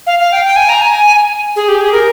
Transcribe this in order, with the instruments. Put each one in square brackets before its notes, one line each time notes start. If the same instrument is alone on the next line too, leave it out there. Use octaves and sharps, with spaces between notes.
[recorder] F5
F5
G5
G5
G#5
A#5
G#5
G#4
G4
G#4
A#4